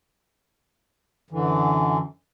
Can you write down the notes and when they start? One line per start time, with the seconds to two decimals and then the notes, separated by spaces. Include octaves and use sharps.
1.30 F#2 D3 E3